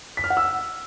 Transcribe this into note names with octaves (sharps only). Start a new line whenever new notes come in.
B6
F6
F#5
E6